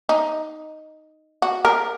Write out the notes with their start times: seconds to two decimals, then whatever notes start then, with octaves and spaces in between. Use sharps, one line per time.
0.09 D#4
1.42 F#4
1.65 A#4